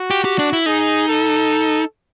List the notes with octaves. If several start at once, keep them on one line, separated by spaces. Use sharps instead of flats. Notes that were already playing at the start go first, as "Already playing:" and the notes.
Already playing: F#4
G4
G4
D4
E4
D#4 G#4
A4